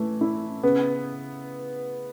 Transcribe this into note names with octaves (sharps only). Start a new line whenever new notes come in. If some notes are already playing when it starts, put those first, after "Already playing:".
Already playing: E3 A3
E4
C#3 B3